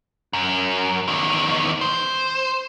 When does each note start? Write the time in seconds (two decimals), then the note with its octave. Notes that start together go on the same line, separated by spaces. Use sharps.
0.33 F#2
1.08 E2 D#3
1.81 C5